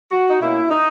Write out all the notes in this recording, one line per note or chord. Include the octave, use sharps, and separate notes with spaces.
F#4
D#4
B2 A#3 C#4 E4
D#4